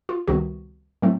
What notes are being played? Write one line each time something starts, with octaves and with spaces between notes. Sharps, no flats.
F4
C#2 C3 D#3 G3 B3 F#4
A2 F#3 A3 C4